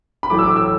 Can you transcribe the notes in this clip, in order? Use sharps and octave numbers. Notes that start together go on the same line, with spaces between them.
B5
A1 A2 F#3 A3 D6
E6
D6
E6